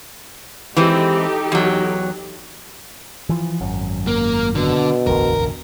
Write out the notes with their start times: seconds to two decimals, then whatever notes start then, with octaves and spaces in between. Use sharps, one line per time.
0.76 E3 G#3 C4 D#4 G4 A4
1.52 E2 F#3
3.29 E3 F3
3.61 G#1 F#2
4.07 A#3
4.55 B2 D3
5.07 E1 A1 D2 A#4